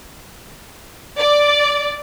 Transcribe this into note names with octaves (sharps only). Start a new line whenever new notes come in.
D5